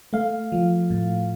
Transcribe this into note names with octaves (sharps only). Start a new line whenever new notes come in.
A3 F5
F3
A2